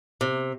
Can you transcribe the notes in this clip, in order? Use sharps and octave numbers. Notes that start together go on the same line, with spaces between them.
C3